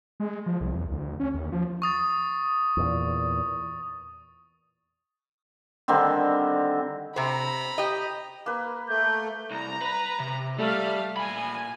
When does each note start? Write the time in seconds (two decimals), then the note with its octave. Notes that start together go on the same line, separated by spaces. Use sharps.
0.20 G#3
0.46 F3
0.60 C2
0.74 E2
0.91 D2
1.20 C#4
1.34 D#2
1.52 F3
1.82 C#6 D#6 A6
2.77 E2 A#2
5.88 D3 D#3 G3 C4
7.16 C3 C5 A#5 B5
7.78 G4 D#5
8.46 A#3 B4
8.89 A3 G6
9.51 C2 A#5
9.81 B4 B5
10.20 C3
10.59 G3 A3 F5
11.17 A#2 G#5 B5